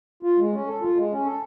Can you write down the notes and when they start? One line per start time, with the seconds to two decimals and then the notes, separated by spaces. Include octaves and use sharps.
0.23 F4
0.38 G#3
0.52 C#4
0.67 A4
0.81 F4
0.96 G#3
1.11 C#4
1.25 A4